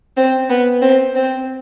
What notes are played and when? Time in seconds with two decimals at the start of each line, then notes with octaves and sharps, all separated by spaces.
0.17 C4
0.49 B3
0.82 C4
1.15 C4